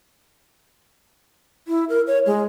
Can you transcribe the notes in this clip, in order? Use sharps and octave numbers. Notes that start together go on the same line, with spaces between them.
E4
A#4
C#5
G#3